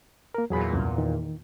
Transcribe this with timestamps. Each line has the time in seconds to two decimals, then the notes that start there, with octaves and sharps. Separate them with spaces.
0.35 A#3 A#4
0.50 E2 A#2 F#3 G#4 B5
0.73 C2 F#2
0.98 D#3